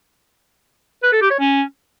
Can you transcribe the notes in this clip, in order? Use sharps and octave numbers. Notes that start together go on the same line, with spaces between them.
B4
A4
G4
C#5
C#4